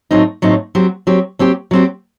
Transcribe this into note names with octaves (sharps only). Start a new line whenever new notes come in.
A2 F#3 C4 D#4
A2 F#3 C4 D#4
F#3 C4 G4
F#3 C4 G4
F#3 C4 G4
F#3 C4 G4